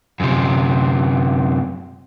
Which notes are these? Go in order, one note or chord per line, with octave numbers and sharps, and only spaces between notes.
F#2 C3